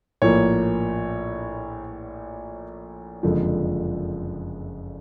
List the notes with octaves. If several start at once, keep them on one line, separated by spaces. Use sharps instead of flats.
A#1 A2 F3 A#3 C#5
F#1 F2 D3 F3 G#3